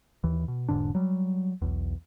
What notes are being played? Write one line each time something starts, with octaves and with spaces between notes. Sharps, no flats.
D#2 E3
B2
E1 G#2 D3 D4
F#3 G3
B1 E2